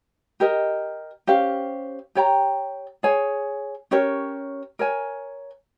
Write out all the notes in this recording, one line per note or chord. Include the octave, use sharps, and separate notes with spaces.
G4 A#4 D#5
C#4 G4 C5 F5
G4 C#5 G5 A#5
G#4 C#5 G#5
C#4 G4 A#4 C#5
A#4 C#5 G#5